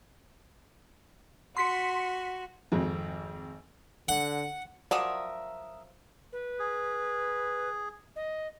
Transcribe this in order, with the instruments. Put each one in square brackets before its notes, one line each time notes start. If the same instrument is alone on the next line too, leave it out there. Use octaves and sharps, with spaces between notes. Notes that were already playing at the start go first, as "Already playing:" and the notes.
[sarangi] F#4 [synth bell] C6 B6 C#7
[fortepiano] G#1 F2
[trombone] D3 [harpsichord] F#5
[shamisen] F3 F#3 D5 [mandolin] A#4 E5 D#6 [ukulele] F#5
[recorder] B4
[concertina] G#4
[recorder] D#5